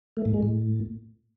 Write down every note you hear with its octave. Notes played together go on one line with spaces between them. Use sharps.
A3
A2
G#3
A2